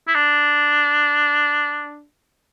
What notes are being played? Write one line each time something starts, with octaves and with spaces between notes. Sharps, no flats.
E4
D4